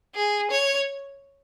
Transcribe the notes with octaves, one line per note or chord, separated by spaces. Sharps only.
G#4
C#5